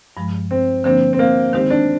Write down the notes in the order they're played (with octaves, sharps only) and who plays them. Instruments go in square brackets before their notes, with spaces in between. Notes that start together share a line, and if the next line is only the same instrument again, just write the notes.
[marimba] G2 F3 G#3
[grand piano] C4
[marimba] D3 F3 A#3 D4 [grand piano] C4
[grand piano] C4
A#3
[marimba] D#3 G#3 D#4 G4 [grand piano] C4
[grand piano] D4